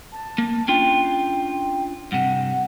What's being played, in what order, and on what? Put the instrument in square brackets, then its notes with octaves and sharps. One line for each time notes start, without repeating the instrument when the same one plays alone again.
[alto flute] A5
[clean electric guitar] A#3
[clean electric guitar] C#4 D4 F4 [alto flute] G5
[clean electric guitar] G2 C3 [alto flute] F#5